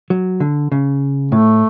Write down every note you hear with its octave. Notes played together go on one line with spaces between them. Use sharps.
F#3
D3
C#3
A2 A3